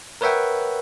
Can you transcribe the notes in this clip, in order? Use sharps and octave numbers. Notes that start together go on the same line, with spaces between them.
A#4 B4 C#5 E5 F#5 G5